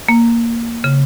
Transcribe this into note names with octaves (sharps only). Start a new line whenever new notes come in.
A#3
C#3